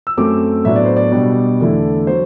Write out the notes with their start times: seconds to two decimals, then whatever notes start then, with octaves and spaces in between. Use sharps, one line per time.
0.07 E6
0.17 F#2 F#3 A3 C4 D6
0.64 A2 F#3 B3 D4 E5
0.76 D5
0.85 C5
0.97 D5
1.12 B2 G3 B3 D4
1.60 E2 D3 A3 E4
2.07 F#3 C5